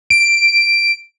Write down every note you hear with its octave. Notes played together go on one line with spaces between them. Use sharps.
D7